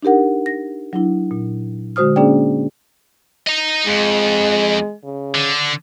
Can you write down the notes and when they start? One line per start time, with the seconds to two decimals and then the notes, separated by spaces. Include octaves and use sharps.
0.03 D4 D#4 G4 A#4 F#5
0.46 A#6
0.93 F#3 D4 E4
1.31 A#2
1.96 D3 G#3 F#4 C5 D#6 F6
2.16 A#3 C#4 D4 G#4 D5 G5
3.47 D#5 A#5
3.87 F2 G#3
5.04 C#3
5.35 D3